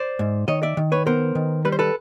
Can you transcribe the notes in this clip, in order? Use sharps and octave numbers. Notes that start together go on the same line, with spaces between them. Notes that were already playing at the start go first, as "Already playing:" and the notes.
Already playing: C5 D5
G#2
D#3 C#5 D#5
D5 E5
D#3
B4 C#5
B3 A#4 C5
D#3
G3 B4
C5
A4 B4